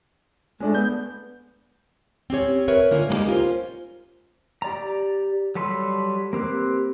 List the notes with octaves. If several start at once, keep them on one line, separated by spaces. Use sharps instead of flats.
G#3 A3 D4
B3 G6
C4 C#4 G4 C#5
A#4 B4 C#5 E5
D3 A#3 C#4 F4 A#4
G#3 A#3 B3 D#4 G4
C#4 F4 A#4 C5
G4 D5 A#5
F#3 G3 A4 B4 C6
A#3 C4 G4 B4